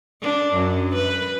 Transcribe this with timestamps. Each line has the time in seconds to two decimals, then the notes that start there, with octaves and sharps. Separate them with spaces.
0.21 D4
0.53 F#2
0.94 B4